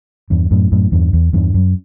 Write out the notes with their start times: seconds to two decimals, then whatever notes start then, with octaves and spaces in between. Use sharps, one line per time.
0.30 E2 G2
0.51 F#2 A2
0.72 F#2 A2
0.92 E2 G2
1.13 E2
1.33 E2 G2
1.54 F#2